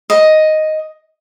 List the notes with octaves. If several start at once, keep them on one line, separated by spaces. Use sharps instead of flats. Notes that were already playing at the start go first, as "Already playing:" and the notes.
D#5